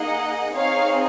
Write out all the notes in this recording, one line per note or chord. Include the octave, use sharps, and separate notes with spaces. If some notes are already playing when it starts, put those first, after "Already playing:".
Already playing: A#3 D#4 G#4 D#5 F#5
C4 D#4 G#4 C#5 F5